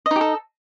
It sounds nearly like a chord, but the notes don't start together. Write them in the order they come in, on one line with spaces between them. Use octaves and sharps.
D#5 D#4 G4 A4